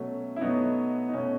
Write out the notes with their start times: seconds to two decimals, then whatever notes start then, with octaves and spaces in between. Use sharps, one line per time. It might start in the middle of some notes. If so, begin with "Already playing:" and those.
Already playing: B2 F#3 A3 C#4
0.36 E4
0.41 B2 F#3 A3 B3 D#4
1.09 D#4
1.13 B2 A3 C#4